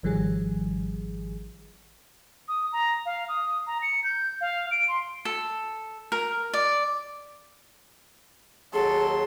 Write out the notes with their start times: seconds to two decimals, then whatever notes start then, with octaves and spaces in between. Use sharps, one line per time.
0.03 G#1 D#3 F3 G3 G#4
2.48 D#6
2.73 A#5
3.06 F5
3.29 D#6
3.67 A#5
3.83 C#7
4.04 G6
4.41 F5
4.71 D7
4.88 C6
5.25 A4
6.12 A#4
6.53 D5
8.74 D#2 F#3 G#4 A4 C6